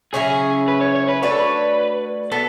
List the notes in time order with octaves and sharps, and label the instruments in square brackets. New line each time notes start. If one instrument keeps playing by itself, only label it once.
[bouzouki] C#3 F#3 C#4 E4 [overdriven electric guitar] G#4
[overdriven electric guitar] B4
C#5
C#5
B4
[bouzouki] A3 D4 F#4 C#5 [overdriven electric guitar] B4
[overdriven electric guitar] A4
B4
[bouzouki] B3 [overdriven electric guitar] A4